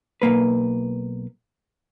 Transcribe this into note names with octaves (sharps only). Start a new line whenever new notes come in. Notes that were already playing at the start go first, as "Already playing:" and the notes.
B1 A#3 B4